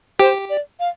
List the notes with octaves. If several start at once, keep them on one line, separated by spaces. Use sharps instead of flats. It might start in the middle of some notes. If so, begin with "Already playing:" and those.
G4 C5
D5
F5